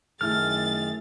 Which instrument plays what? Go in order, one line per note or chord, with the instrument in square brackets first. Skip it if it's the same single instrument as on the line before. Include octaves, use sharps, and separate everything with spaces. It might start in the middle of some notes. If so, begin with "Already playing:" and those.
[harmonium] F#2 D#3 G#4 [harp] A3 E4 [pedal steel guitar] F6 [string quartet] A6